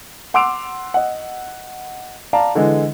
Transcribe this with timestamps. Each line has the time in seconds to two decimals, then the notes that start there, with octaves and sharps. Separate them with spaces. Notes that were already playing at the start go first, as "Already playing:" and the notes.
0.34 F#5 C6 D6 E6 D7 F7
0.94 D#5 F#5
2.33 D5 F5 A5 A#5
2.55 D3 E3 G#3